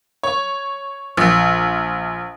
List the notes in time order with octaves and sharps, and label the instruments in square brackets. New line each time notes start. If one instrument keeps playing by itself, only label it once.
[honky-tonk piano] C#5
A#1